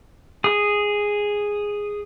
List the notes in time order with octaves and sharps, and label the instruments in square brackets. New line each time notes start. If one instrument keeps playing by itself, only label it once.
[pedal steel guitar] G#4 D#6